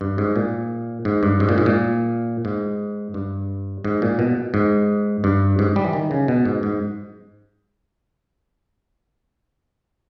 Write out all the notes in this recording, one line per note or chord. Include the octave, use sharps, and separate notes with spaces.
G2
G#2
A#2
G#2
G2
G#2
A#2
G#2
A#2
G#2
G2
G#2
A#2
B2
G#2
G2
G#2
G3
E3
D#3
C#3
B2
G#2
G#2